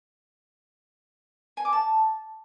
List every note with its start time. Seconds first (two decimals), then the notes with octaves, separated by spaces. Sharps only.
1.57 G#5
1.65 D6
1.73 A5